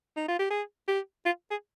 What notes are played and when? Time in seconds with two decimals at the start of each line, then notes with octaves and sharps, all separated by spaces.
0.16 D#4
0.28 F4
0.39 G4
0.51 G#4
0.88 G4
1.25 F4
1.51 G#4